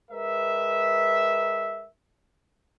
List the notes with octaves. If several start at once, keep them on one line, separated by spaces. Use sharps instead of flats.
G#3 A#4 B4 E5